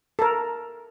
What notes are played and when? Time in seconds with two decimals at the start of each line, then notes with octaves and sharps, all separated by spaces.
0.19 A4 A#4